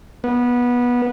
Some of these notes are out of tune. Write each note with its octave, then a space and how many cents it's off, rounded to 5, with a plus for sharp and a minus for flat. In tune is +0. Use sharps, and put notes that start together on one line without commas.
B3 -20